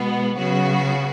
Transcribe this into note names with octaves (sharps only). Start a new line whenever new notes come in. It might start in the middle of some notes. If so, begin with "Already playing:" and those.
Already playing: B2 G#3 B3
C#3 F#3 B3 F#4